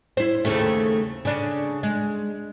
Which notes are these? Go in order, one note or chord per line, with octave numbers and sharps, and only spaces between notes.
E4 C5
D#2 C#3 A3
C#3 D4
G#3